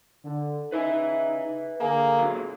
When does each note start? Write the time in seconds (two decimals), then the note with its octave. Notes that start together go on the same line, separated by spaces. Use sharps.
0.24 D3
0.72 C#3 D#4 B4 E5 G#5
1.81 D3 A#3 G#4
2.19 F#2 A#2 F#3